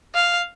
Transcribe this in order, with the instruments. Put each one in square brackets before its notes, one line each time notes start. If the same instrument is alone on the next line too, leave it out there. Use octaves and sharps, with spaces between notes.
[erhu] F5